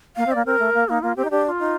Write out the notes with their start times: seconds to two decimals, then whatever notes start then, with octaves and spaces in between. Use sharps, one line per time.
0.16 A#3 F5
0.27 C4
0.31 A#3 D5
0.46 C4 A#4
0.59 A3
0.74 A#3
0.88 A#3 D#4
1.03 A#3 F4
1.16 C4 G4
1.25 D#4
1.31 D4 G4
1.45 G4
1.49 F4
1.59 D#4